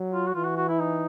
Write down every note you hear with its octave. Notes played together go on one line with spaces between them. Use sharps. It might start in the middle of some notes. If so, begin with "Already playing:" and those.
Already playing: F#3
F4
F#4
E3 F4
F#4
F#4
E4
D#4